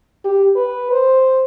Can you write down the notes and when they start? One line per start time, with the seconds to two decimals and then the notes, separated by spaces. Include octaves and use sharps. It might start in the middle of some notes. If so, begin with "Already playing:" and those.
0.25 G4
0.56 B4
0.92 C5